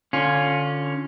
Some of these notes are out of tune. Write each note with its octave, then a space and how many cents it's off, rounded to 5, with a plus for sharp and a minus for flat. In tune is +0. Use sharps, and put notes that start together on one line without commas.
D3 +0 C#4 +0 F4 +20